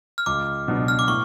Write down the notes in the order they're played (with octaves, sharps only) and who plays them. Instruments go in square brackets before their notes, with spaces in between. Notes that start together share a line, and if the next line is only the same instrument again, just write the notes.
[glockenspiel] F6
[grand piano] C#2 [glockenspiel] D6
[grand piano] B2 F#3 B3 D4
[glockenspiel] F6
D6
[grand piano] A2 [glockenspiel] C#6